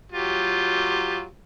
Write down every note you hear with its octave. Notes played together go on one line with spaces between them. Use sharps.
F#3 F4 G4